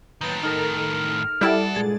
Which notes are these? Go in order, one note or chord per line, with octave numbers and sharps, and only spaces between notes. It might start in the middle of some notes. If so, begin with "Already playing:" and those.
A2 D#3 F#3 A#3 B4 G6 A6
D#4 A4 A#4 F6
G3 E4 A4 B4 D5 F#5 A5
G2 A#2 G#3 G#4 A6